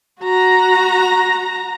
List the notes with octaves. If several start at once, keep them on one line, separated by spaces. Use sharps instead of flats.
F#4 A#5